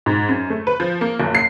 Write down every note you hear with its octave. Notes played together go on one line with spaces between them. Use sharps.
G#2
F#2
A3
B4
F3
A#3
F#1
C7